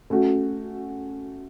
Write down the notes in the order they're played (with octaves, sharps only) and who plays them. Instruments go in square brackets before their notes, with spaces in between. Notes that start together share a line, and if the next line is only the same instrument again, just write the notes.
[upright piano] A3 C#4 F#4